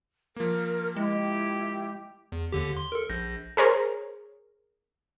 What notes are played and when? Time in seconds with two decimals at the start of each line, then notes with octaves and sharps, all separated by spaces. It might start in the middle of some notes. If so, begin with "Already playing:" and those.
0.36 F3 A#3 A#4
0.96 G#3 E4 G4
2.32 E2
2.52 D#2 D3 G4
2.77 C6
2.92 A4 A#4
3.10 A#1 G6 A#6
3.57 G#4 A#4 C5 C#5